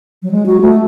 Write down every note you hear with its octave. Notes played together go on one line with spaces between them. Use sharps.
F#3
G#3
F#4
A3